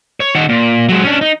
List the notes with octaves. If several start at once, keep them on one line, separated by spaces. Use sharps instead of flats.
C#5
D#3 F#5
A#2
F#3 G#3
C#4 D4
D#4